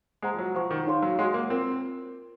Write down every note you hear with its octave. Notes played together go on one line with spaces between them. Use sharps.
G#3 C5 F#5 A#5
F3
F#3
F3 F4 C5 F#5 C#6
D#3
D#4 G#4 C#5 F5 C6
F#3
G#3 F#4 C#5 F#5 C6
A#3
C4 F4 A#4